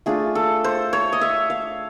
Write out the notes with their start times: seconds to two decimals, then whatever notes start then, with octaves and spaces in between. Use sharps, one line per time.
0.06 A3 D4 F4 G#4
0.35 A4
0.64 C5
0.93 C#5
1.13 D#5
1.21 E5
1.50 F5